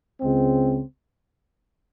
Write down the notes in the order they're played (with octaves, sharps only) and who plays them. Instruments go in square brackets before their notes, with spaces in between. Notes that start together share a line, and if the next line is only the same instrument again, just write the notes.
[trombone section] C#2 C#3 G#3 C4